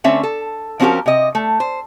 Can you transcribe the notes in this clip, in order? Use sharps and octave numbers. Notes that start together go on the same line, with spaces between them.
D3 A3 C4 C#4 E5
A4
F3 C4 C#4 F#4 G4 A#4
C3 D#5
A3
C5